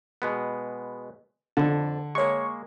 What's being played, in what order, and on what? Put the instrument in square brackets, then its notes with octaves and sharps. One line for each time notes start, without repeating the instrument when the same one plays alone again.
[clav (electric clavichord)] B2 G#3 B3
[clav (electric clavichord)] F2 A5 [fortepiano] D3
[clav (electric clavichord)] G#3 A#3 [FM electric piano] C#5 C#6